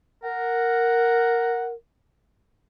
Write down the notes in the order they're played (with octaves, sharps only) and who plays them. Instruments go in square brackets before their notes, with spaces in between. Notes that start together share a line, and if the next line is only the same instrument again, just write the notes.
[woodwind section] A#4 [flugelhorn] F#5